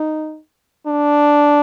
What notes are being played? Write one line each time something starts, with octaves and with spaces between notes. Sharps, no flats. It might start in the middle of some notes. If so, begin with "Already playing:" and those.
Already playing: D#4
D4